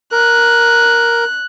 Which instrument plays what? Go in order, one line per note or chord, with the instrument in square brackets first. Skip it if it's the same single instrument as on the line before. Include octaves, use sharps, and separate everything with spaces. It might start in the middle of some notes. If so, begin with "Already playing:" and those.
[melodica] A#4 [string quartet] F#6